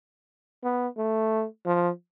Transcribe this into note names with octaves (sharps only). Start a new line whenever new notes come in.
B3
A3
F3